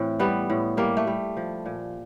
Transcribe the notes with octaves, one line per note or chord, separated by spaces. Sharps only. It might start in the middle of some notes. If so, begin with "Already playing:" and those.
Already playing: A2 E3 C4
G3 B3
A2
G3 A#3
A3
G3
F3
A#2